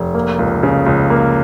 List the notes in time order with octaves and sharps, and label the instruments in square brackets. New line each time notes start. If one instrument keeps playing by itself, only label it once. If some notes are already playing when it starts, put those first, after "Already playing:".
Already playing: [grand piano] F1
A#3
C#2
C#3
C#2
A#3